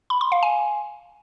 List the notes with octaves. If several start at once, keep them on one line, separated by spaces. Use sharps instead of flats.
B5
C6
F5
G#5